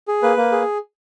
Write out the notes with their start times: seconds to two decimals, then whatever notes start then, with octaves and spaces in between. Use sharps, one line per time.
0.08 G#4
0.23 A#3 B4
0.37 A#3
0.52 G#4